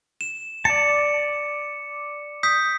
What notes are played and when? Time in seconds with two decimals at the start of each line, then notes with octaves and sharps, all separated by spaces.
0.21 E7
0.65 D5 A5 C#7
2.43 D#6 G6 B6